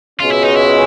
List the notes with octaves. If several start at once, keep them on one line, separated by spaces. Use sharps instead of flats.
C#2 B2 G#3 C#4 F4
E4
D#4
E4